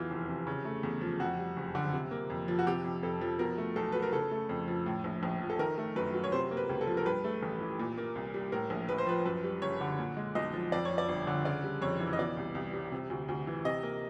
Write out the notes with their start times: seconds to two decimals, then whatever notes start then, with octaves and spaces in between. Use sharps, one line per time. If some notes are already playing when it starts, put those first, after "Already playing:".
Already playing: E2 E3 F#3 F4
0.10 F1
0.28 C3
0.47 C#3
0.65 A3
0.83 E2
1.01 F3
1.20 F2 F#4
1.38 G3
1.57 F#1
1.75 D3
1.93 C3
2.11 A#3
2.30 F2
2.48 F3
2.59 F#4
2.67 C3 G4
2.84 F2
3.03 F2 A4
3.21 F3
3.39 B2 A#4
3.58 A3
3.76 B1 A4
3.92 F#3 B4
4.02 A#4
4.12 C#3 A4
4.31 A3
4.49 F2
4.68 F3
4.86 A2
5.04 A#1
5.23 A#1
5.41 F3
5.50 A4
5.59 D#3 A#4
5.78 A3
5.96 F#2 B4
6.14 F#3
6.24 C#5
6.32 C3 C5
6.51 A#3
6.57 B4
6.69 C#2
6.81 A4
6.87 F3
6.97 A#4
7.06 G2 B4
7.24 A3
7.43 A1
7.61 E3
7.79 A#2
7.98 A#3
8.15 C2
8.34 G3
8.52 A2 A#4
8.70 A#1
8.89 A#1 B4
8.98 C5
9.07 F3 B4
9.26 F#2 B4
9.44 G3
9.62 F#1 C#5
9.81 D3
9.99 A#2
10.17 G#3
10.35 B1 D#5
10.53 F3
10.72 F2 D5
10.85 C#5
10.90 F3
10.98 D5
11.09 G1
11.27 D3
11.45 C#3 D5
11.64 G3
11.82 F2 C#5
12.00 E3
12.13 D#5
12.19 B2 D5
12.37 C2
12.55 C2
12.73 G3
12.92 C3
13.10 D2
13.28 D2
13.47 E3
13.65 C3 D#5
13.83 A#3